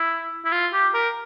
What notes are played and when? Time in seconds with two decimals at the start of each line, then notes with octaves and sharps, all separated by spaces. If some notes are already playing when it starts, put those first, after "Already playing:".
Already playing: E4
0.45 E4
0.52 F4
0.73 G4
0.94 A#4